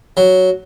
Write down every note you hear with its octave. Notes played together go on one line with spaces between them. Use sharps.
F#3